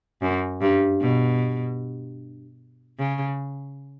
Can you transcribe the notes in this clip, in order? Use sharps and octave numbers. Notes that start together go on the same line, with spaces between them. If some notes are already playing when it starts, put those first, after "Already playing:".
F#2
G2
B2
C#3